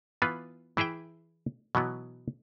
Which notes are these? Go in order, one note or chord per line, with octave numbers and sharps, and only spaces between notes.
E3 B3 F4 B4
E3 E4 G#4 E5 G5
B2 E3 F#3 B3